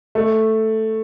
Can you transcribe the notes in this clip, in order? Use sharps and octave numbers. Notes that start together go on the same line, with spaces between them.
A3